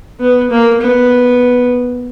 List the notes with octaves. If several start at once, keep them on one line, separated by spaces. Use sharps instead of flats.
B3
A#3
B3